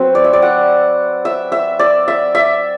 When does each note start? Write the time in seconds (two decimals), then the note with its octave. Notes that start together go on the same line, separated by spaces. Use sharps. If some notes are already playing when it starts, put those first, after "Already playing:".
Already playing: F#3 C4 B4
0.15 D5
0.24 E5
0.33 D5
0.42 F#5
1.25 E5
1.52 E5
1.79 D5
2.08 E5
2.35 E5